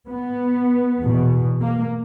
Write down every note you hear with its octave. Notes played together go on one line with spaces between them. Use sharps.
B3
E2 B2
A#3